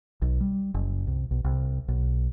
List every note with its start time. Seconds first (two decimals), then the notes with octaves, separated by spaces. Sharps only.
0.22 B1
0.40 G3
0.74 F#1
1.07 C2
1.31 B1
1.44 C2
1.88 B1